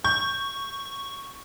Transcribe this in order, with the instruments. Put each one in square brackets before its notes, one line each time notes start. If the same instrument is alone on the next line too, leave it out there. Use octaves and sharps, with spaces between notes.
[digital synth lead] C#6 [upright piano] G6